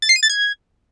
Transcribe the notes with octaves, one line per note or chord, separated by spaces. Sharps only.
A6
C7
D#7
A6
G#6